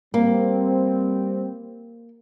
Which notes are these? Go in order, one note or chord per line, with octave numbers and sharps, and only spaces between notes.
G3 A#3 C4